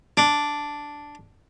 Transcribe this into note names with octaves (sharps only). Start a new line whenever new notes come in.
D4